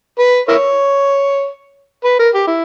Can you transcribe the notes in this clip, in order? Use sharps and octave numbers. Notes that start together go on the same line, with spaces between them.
B4
E4 A#4 C#5
B4
A#4
G4
E4